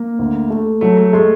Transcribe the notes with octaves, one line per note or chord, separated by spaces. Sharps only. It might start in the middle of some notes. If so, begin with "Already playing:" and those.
Already playing: A#3
D2
A3
F#3 A3
A3
G#3 A3